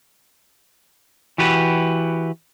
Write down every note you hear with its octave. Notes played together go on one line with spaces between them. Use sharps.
E3 F#4 G4 B4